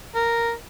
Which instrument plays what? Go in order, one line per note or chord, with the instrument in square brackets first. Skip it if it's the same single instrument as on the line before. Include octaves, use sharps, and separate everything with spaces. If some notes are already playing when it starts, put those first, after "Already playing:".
[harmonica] A#4